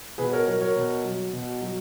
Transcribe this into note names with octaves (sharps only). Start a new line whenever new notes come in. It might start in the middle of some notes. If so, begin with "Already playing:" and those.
B2 G#4 B4
A#4 C#5
F#3 A#4 C#5
A#4 C#5
B2
F#3
B2
F#3